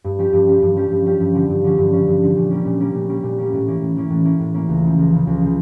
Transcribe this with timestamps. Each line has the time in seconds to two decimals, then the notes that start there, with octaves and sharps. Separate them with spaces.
0.04 G2
0.19 F3 C#4 G4
0.33 G2
0.47 F3 C#4 G4
0.62 G2
0.76 F3 C#4 G4
0.91 G2
1.06 F3 C#4 G4
1.20 G2
1.34 D3 F3 C#4
1.49 G2
1.64 D3 F3 C#4
1.78 G2
1.93 D3 F3 C#4
2.08 G2
2.22 D3 F3 C#4
2.36 A#2
2.51 G3 A#3 C#4
2.65 A#2
2.80 G3 A#3 C#4
2.95 A#2
3.09 G3 A#3 C#4
3.23 A#2
3.38 G3 A#3 C#4
3.53 A2
3.67 E3 A#3 C#4
3.81 A2
3.96 E3 A#3 C#4
4.10 A2
4.25 E3 A#3 C#4
4.39 A2
4.54 E3 A#3 C#4
4.69 C#2
4.84 C#3 F3
4.98 C#2
5.12 C#3 F3
5.27 C#2
5.41 C#3 F3